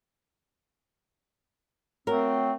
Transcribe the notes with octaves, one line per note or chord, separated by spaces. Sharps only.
F#3 A3 C4 A#4